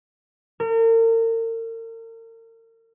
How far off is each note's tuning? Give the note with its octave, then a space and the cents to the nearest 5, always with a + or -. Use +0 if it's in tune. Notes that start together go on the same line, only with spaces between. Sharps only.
A#4 -40